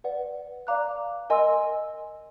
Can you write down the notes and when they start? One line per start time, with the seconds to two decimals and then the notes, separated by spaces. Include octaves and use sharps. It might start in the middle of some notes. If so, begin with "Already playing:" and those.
0.04 B4 D5 F#5
0.67 D5 F5 A#5 D6 F#6
1.30 A#4 D#5 G#5 C6 E6